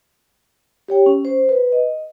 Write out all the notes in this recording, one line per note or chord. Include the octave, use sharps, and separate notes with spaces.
G4 C#5 G5
C#4
C5
B4
D#5